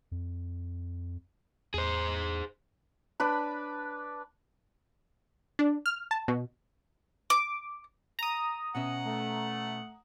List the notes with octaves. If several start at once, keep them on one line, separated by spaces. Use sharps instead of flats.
F2
E2 G#4 C5
D4 B4 B5
D4
F6
A5
B2
D6
A#5 D#6
B2 C#4 E5 F#5
A3